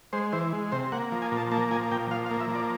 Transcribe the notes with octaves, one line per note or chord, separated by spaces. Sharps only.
G#3 C5
E3 C5
G#3
C3 C5
A#3 F#5
F3
G#5
A#2
A5
A#3 A5
F3 G#5
A#2 G5
F3 F5
F5
A#3
E5
F3 D5